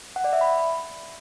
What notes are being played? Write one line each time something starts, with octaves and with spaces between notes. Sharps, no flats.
F#5
D5
E5
B5